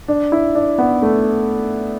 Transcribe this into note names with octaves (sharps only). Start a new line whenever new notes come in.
D4
E4
D4
B3
A3